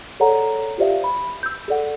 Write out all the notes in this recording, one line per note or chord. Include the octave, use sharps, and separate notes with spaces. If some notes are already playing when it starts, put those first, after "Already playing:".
G#4 A4 C#5 D5 F#5 A#5
F4 G4 C5 D5 E5 F5
B5
E6 G6
G#4 A4 D5 F#5